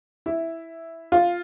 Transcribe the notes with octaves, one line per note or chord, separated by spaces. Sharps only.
E4
F4